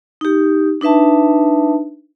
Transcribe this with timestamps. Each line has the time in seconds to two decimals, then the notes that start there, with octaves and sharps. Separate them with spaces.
0.21 D#4 G4
0.81 D4 D#4 B4 E5 A5